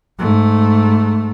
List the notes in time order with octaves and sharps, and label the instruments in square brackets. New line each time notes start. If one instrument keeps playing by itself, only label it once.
[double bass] G#2 A3